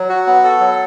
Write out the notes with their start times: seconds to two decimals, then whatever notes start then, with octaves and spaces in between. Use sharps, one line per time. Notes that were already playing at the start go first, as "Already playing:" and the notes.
Already playing: F#3
0.09 F#4
0.27 B3
0.44 A4
0.60 F#3